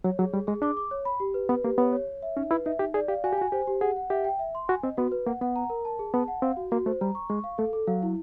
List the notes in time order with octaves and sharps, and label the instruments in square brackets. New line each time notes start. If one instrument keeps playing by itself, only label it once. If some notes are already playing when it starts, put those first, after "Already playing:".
[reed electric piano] F#3 [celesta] C#5
[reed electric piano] F#3 [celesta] G#4
[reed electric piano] G3 [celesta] G#4
[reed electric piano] G#3 [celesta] G#4
[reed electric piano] D4 [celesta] D6
[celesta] D6
C#5
B5
G4
B4
[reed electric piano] B3 [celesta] B4
[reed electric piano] A#3 [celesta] G4
[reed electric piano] B3 [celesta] C#5
[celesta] C#5
C#5
E5
[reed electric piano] C#4 [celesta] D#4
[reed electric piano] E4 [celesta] B4
[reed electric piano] D#4 [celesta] E5
[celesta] D#4 [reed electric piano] G4
[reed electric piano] G#4 [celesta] D5
[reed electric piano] G4 [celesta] F5
[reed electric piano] F#4 [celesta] G#5
[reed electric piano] G4
[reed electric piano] F#4 [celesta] G#5
[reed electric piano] G4 [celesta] C5
[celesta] G4
[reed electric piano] G#4 [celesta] F#5
[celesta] F#5
[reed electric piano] G4 [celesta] E5
[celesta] G5
E5
C6
[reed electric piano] F#4 [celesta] G#5
[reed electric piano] C4 [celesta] D#5
[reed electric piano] B3 [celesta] F#4
[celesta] B4
[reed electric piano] A#3 [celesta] F#5
[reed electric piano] B3 [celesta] F#5
[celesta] A#5
A#4
A5
G#4
[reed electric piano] B3 [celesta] A5
[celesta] F#5
[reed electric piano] C4 [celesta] F5
[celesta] F#4
[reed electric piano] A#3 [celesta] F#4
[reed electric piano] A3 [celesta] C5
[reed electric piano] G3 [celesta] A#5
[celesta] C#6
[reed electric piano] G#3 [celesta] C#6
[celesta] F5
[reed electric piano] A3 [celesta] A4
[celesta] A4
[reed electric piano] F#3 [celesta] F5
[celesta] E4